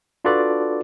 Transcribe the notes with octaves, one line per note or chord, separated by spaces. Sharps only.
D4 F4 F#4 A4 B4 D5